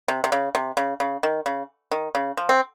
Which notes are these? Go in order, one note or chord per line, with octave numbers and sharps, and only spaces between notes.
C3
C3
C#3
C3
C#3
C#3
D#3
C#3
D#3
C#3
F3
C4